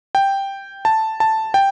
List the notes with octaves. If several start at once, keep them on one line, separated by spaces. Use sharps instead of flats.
G5
A5
A5
G5